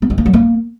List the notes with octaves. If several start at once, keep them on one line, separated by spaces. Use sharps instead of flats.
B3
G#3
A#3
F#3
A#3